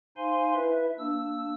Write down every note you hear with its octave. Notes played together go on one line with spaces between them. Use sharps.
D#4 C5 F5 G#5 C6
E4 B4 E5
A#3 D4 E6